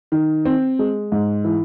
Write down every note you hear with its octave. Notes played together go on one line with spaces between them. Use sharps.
D#3
C4
G#3
G#2
E3